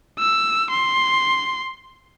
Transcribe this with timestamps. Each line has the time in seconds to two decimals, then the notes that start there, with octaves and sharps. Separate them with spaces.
0.19 E6
0.71 C6